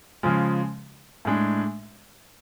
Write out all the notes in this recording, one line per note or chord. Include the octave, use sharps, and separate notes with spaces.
C#3 F3 G#3
A2 G#3 D4